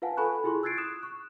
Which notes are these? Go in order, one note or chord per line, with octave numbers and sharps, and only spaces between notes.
F4 B4 F5 F#5 G#5 A5
A4 G#5 B5 C#6 F#6
E4 F4 G#4 C6 C#6
E6 F#6 G#6 A6 C7 D7
D#6 F#6 E7
C#6 F#6